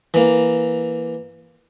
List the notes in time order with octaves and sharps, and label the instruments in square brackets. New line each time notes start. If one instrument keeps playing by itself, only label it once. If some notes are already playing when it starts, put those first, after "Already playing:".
[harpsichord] E3 A#3